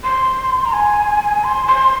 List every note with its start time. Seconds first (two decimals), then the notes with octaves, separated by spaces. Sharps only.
0.04 C6
0.65 A#5
0.73 G#5
1.44 C6
1.67 C6